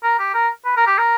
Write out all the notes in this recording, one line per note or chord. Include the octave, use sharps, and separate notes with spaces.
A#4
G4
A#4
B4
A#4
G4
A#4